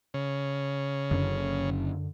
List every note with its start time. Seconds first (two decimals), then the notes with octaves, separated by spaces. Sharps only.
0.14 C#3
1.11 F#1 F#2 D3 C#4